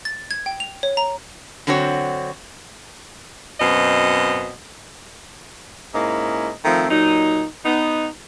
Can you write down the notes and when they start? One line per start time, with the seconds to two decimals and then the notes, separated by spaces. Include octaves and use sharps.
0.05 A6
0.31 G#6
0.46 G5
0.60 F7
0.83 C#5
0.97 A#5
1.67 D3 F#3 C4 F#4 C#5
3.60 F#2 B2 C4 D#5
5.94 G#2 A#3 C#4 E4 D#5
6.65 D#3 F3 A3 C4
6.90 A#2 F#3 D#4
7.65 B3 D#4